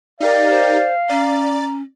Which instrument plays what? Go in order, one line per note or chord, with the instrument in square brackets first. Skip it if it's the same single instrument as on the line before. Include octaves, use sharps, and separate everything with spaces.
[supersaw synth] D#4 G4 A#4 [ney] D5 [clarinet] F5
[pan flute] C5
[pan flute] C#4 [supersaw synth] D5 A6 [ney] A#5